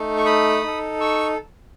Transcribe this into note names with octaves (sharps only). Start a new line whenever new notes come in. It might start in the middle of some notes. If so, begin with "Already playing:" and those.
Already playing: A3 D#4 A4
C#6
B5 D#6
D#4 A4
C#6 E6